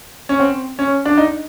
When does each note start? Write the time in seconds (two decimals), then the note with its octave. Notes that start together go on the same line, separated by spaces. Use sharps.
0.29 C#4
0.40 C4
0.79 C#4
1.05 D4
1.17 D#4